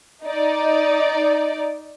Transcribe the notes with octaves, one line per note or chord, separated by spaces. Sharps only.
D#4 D5